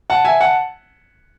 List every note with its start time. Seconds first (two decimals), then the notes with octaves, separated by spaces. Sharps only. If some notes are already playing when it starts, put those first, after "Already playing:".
0.10 F#5 A5
0.25 E5 G#5
0.40 F#5 A5